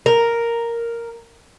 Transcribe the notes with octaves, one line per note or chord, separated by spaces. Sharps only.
A#4